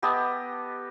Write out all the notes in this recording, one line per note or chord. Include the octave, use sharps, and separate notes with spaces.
B3 G4 A4 D#5